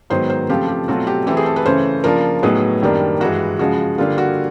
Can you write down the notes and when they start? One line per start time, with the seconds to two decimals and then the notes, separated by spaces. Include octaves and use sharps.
0.10 G#2 D#3 F#3 B3 C5
0.30 C5
0.49 C#3 F3 A3 C4 F4 G4
0.68 G4
0.88 B2 F#3 A3 C4 F4 F#4
1.07 G4
1.26 E3 A3 C4 E4 G4
1.37 G#4
1.46 A4
1.56 B4
1.65 C#3 E3 A3 C#4 C5
2.04 C#3 F3 A#3 D4 F4 A#4
2.43 A2 F#3 B3 D#4 G#4
2.82 F#2 D#3 G3 A#3 D4
3.20 G2 E3 G#3 F#4
3.59 C#3 F3 G#3 F#4
3.98 D3 G3 A#3 F4
4.18 F#4